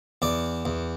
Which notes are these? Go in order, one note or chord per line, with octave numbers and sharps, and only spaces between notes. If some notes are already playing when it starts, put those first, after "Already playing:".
E2 D5
E2